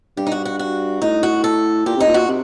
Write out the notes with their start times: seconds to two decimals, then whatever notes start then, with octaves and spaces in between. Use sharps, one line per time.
0.17 G2 G4
0.27 D#4
0.32 F#4
0.45 F#4
0.59 F#4
1.01 A2 D#4
1.23 F#4
1.44 A4
1.86 A#2 G4
1.96 C3 D#4
2.07 A#2
2.14 F#4
2.28 C3